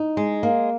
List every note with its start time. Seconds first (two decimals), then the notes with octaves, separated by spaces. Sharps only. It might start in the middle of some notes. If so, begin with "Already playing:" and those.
Already playing: D#4
0.17 G#3
0.43 A#3